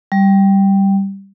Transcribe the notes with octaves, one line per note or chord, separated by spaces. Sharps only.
G3